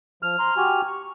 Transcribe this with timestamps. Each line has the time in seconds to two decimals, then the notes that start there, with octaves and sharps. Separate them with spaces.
0.23 F3 F6
0.39 A#5 C6
0.57 F#4 G4 G#5
0.87 C#6